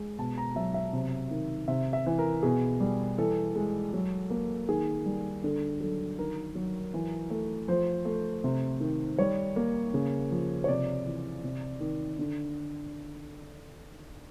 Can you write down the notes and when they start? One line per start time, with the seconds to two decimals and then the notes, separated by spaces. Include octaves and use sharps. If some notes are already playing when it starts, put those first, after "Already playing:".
Already playing: G#3
0.18 B2 A5
0.38 A#5
0.56 F#3 E5
0.74 E5
0.93 C3
1.31 D#3
1.68 C3 E5
1.93 E5
2.06 E3
2.19 A#4
2.43 B2 G#4
2.80 G3
3.18 E3 A4
3.56 G#3
3.93 F#3
4.30 A#3
4.69 D#3 G#4
5.06 G3
5.44 D3 A4
5.80 F#3 A4
6.18 D#3 A#4
6.55 F#3
6.94 E3
7.30 A3
7.68 F3 C5
8.05 A3
8.44 C3
8.80 D#3
9.19 G3 C#5
9.56 A#3
9.94 C#3
10.31 F3
10.64 C#5
10.68 C3 D5
11.06 E3
11.44 C3
11.80 D#3
12.19 D3